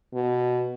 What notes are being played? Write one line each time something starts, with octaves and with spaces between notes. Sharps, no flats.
B2